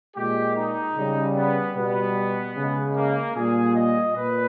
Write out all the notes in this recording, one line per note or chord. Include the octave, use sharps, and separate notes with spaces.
A#2 G#3 G4
D#4
C#3 G3
B3
B2 G3 B3
C#3
G#3
A#3
A#2 G3 G#4
D#5
A#2 B4